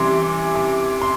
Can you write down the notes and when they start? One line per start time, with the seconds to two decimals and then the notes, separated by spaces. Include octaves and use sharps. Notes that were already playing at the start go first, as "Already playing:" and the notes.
Already playing: C3 E3 G3 C6 D6
0.55 D6
1.02 C6